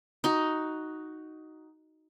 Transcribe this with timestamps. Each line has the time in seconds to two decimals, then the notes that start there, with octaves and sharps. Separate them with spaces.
0.24 D#4 F#4